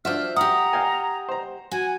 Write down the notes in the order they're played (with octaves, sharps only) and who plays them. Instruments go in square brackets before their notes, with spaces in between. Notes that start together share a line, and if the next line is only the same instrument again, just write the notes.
[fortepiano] D4 F4 F#4 [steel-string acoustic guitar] C5 E5 [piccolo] F6
[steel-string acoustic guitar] G4 F#5 [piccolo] A#5 [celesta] D#6
[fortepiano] F5 G5 G#5
C5 A#5
[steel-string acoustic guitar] F#4 [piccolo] G#5